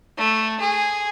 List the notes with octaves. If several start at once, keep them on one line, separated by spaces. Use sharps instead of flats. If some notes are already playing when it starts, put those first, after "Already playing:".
A3
G#4